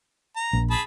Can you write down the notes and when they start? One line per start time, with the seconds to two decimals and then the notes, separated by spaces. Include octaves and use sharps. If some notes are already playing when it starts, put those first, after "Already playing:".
0.36 A#5
0.53 A#1
0.71 G#4 A5 B5